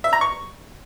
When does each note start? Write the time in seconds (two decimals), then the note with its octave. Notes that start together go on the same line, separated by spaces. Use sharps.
0.04 E5
0.13 A#5
0.21 C#6